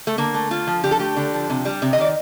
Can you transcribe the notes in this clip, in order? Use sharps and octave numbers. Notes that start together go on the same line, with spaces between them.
A3
D3 A#3
A3
D3 F4
F3
D3 G4
A4
A3 G4
D3
F3
C3
G3
C3
D#5
D#3 D5